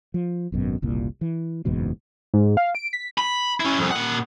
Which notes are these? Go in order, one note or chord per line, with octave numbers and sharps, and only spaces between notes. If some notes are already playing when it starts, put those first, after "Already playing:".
F3
G#1 F#2 B2
F#1 C2 A#2
E3
F#1 E2 G#2 B2
G#2
F5
D7
B6
B5
C#4 E4
C2 F2
A#2 F#5